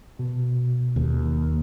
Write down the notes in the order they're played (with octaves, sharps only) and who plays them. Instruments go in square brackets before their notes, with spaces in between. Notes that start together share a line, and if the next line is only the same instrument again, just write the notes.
[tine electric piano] B2
[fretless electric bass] D#2